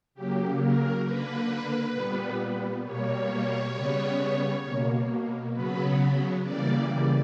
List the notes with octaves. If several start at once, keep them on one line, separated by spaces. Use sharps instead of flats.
C#3 F#3 A#3 G4
A#4
D3 A#3 B4
A#2 G3 B3
B2 G3 A#3 C#5
C#3 G3 B3
B2 A#3
C#3 F#3 B3 B4
C#3 E3 G3 A#3 D5